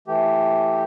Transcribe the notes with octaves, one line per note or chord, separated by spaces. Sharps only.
E3 A3 G4